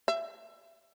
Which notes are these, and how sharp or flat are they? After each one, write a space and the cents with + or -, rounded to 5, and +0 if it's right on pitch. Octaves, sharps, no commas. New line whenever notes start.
E5 +10